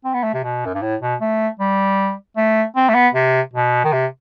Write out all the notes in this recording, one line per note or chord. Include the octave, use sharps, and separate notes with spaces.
C4
B3
A3
C3
B2
F#2
G2
A2
B2
A3
G3
A3
C4
A3
B3
C3
B2
D#3
C3